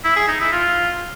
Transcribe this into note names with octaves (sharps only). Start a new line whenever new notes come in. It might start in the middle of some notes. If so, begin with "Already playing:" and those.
E4
G#4
D#4
E4
F4